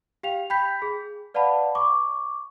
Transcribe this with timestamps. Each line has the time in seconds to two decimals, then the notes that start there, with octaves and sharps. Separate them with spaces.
0.23 G4 F5 G5 F7
0.50 G5 B5 G6 B6
0.82 G#4
1.34 B4 D5 F5 F#5 A5 B5
1.75 C#6 D6